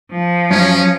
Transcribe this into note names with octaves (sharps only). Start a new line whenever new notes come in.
F3
F#2 C#4